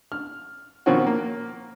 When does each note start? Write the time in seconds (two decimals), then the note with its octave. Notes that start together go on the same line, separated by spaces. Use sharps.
0.12 F6
0.86 B2 D#3 F3 C4 C#4 F#4
1.07 A#3